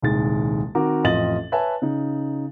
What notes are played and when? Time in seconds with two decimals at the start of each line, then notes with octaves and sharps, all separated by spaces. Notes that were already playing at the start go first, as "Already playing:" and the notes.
0.02 D#1 C2 D#3 G#3 A6
0.75 D#3 C4 F#4 A#4 D6
1.04 A1 F2 F4 D#5 A6 F#7
1.52 B4 C#5 E5 G#5 A5
1.82 C#3 D#4